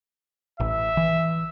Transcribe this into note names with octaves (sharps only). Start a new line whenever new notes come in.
A1 E5
E3